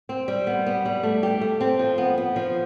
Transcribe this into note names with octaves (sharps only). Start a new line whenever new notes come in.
C4
G3
B3
B3
G3
A3
G4
A3
C4
F3
B3
B3
F3